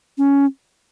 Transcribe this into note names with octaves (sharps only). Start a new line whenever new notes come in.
C#4